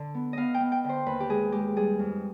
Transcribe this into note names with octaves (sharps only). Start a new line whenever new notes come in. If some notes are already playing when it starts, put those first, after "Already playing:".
Already playing: D3
B3
B3 D#5 F5
G5
B3
G5
D3
C5
D#2 B4
G4
G#3 G#4
G#3 G4
G3 G#4
F2